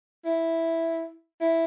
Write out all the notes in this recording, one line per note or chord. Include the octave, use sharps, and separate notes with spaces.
E4
E4